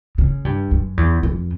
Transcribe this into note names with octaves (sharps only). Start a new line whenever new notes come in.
C#3
G2
F#2
E2
F2